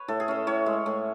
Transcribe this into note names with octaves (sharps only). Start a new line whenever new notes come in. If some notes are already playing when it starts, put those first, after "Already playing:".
Already playing: B4 C#5
A2 A4
G#4
C#4 A4
A2 C#5
G#3
A2